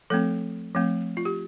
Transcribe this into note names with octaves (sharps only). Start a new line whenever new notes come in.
F3 A3 C4 A4
F3 A3 C4
F4
G4